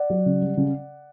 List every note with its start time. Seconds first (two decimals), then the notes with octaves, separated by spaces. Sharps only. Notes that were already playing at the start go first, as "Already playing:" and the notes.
Already playing: D5 F#5
0.10 F#3
0.26 C#3
0.42 G3
0.57 C#3